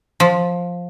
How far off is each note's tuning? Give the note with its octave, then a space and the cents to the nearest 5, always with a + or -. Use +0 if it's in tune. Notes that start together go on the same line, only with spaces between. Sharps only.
F3 +10